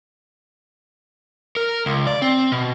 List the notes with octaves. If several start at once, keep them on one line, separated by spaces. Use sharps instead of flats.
A#4
C#2
D5
C4
B2